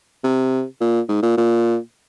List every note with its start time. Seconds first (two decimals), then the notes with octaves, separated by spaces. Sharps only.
0.24 C3
0.81 A#2
1.09 G#2
1.23 A#2
1.37 A#2